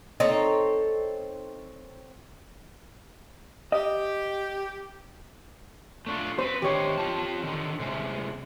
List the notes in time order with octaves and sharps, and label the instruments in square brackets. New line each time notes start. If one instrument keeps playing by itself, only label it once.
[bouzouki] C4 A4 C#5 [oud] D#4
[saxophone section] G4 [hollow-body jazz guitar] D#5
[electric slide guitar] A3 D4 F4
[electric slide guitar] C4 B4 [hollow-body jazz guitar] C5
[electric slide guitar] D#3 D4 C5 [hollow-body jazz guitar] G4 C#5
[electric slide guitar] C4 F4 A5
D3 D#3
C3 G3 G#3